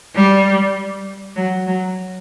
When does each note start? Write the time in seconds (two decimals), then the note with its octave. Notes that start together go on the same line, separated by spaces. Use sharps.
0.15 G3
1.36 F#3
1.67 F#3